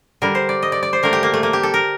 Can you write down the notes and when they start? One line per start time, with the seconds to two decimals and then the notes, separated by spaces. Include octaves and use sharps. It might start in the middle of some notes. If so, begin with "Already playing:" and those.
0.22 D3 G3 A#4
0.35 C5
0.49 D5
0.63 D#5
0.72 D5
0.83 D5
0.93 C5
1.03 D3 A3 A#4
1.13 G4
1.23 A#3
1.34 A3
1.43 A#3
1.53 G4
1.63 A4
1.74 A#4